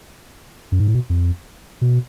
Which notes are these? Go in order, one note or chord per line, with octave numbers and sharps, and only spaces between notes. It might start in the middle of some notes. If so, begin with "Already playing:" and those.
F#2
G#2
A2
B2
F2
B2